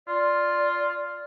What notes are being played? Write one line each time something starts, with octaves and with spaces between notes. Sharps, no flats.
F4 D5